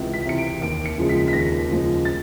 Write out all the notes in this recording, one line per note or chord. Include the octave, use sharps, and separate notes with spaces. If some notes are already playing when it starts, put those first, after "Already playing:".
Already playing: C#2 C3 E3
B6
C3 E3 C#7
D7
D#2 D7
C#7
C#3 F3 G#3
B6
B6
D#2 A#6
C#3 F3 G#3
A6